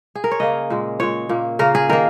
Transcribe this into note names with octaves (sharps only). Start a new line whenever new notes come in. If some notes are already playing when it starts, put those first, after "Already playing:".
G#4
A#4
C#5
C#3 A#3 D#5
A#2 G#3
A#2 G#3 C#5
A#2 A#3
C#3 A#3 A#4
G#4
D#3 A#3 A#4